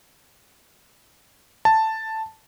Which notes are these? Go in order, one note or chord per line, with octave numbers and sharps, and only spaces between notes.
A5